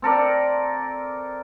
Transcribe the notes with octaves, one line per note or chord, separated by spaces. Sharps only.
C4 A4 A#4 D5